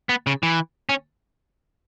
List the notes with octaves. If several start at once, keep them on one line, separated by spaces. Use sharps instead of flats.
B3
C#3
E3
C#4